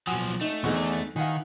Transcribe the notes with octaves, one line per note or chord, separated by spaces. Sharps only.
B1 F3 F#4 G#5 D#6
A3 D#4
E2 D3 C4 D#4 G#4 C#6
D#3 E3 F5 F#5 G#5